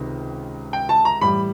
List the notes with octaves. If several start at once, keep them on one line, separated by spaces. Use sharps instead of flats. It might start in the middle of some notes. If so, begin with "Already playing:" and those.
Already playing: C#2 C3 D#3
G5
A5
A#5
A2 E3 G3 B5